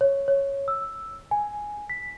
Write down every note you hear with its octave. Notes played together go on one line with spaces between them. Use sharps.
C#5
C#5
E6
G#5
B6